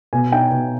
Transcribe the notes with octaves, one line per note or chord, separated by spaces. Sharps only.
B2 G#5
D#4 G5
B2